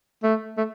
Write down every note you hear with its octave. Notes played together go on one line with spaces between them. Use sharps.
A3
A3